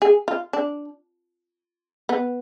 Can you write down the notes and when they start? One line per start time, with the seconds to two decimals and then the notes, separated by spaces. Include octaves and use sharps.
0.02 G#4
0.28 F4
0.53 D4
2.09 B3